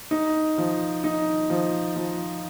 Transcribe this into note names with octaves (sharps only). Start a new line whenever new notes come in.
D#4
F3
D#4
F3
F3